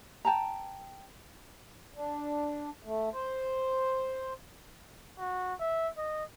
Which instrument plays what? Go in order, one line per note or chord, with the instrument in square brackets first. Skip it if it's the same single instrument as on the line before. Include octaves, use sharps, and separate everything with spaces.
[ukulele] G5 A5 A#5
[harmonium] D4
A3
C5
[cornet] F#4
E5
D#5